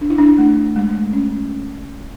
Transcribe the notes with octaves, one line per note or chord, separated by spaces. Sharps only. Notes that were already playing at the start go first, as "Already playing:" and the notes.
D4
E4
D4
A3
G#3
A3
C#4